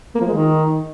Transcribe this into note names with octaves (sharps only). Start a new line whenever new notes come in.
A#3
F3
G#3
D#3